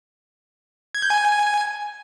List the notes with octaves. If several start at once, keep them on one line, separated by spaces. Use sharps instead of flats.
G#6
G6
G#5